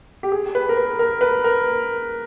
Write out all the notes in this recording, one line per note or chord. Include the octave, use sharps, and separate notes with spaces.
G4
G#4
B4
A#4
B4
A#4
B4
A#4